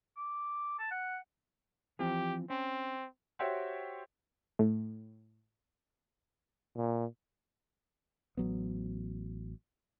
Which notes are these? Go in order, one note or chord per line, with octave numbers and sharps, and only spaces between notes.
D6
A5
F#5
E3 F3 C4 G4
C4 C#4
F#4 G4 C5 C#5 E5 G5
A2
A#2
A1 F#3 B3